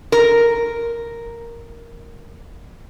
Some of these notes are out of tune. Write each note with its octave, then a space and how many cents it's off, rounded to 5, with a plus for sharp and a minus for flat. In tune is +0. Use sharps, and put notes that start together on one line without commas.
A#4 +0